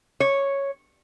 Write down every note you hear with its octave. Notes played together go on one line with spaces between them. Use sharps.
C#5